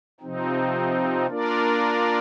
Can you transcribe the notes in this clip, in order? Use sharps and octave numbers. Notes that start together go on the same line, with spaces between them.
C3 F3 C4 D#4
A#3 D4 F4 A#4 D5